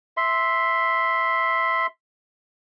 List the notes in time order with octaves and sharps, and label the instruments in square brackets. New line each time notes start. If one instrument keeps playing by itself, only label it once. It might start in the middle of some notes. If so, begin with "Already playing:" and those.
[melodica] E5 C6